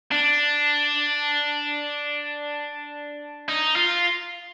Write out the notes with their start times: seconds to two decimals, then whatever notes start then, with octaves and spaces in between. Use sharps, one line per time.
0.12 D4
3.48 D#4
3.76 F4